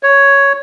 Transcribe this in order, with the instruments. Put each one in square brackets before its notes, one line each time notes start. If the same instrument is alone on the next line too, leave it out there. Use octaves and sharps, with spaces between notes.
[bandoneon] C#5